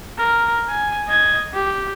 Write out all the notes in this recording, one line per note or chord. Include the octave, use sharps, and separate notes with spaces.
A#4
G#5
D#5 G#6
G4